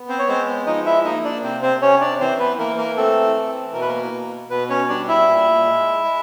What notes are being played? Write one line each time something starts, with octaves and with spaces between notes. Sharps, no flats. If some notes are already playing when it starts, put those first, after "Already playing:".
Already playing: B3
C4 C5
C#5
G#3 C4 C5
F3 D#4 D#5
E4 E5
A#3 D#4 D#5
D4 D5
C3 C4 C5
C4 C5
C3 C#4 C#5
D4 D5
E3 C4 C5
B3 B4
E3 A#3 A#4
A#3 A#4
A3 C4 A4
E3
B2 A#4
B4
A#3 A#4
B2
B2 B3 B4
C#4 C#5
G3 D4 D5
E4 E5
A#2
G#3
G#3